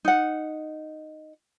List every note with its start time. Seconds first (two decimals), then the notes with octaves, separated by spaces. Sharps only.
0.05 D#4 F#5